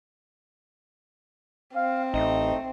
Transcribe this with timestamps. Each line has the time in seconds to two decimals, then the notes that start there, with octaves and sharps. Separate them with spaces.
1.76 C4 F5
2.14 A1 A3 D#4